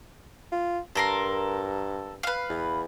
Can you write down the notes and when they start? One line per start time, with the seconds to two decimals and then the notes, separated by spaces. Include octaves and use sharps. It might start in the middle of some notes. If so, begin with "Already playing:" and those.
0.52 F4
0.95 G2 A4 A#4 C6
2.23 B4 F5
2.49 E2